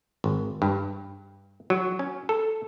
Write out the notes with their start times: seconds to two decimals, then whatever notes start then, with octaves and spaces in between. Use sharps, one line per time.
0.24 G#1
0.62 G2
1.70 F#3
1.99 C#4
2.29 A4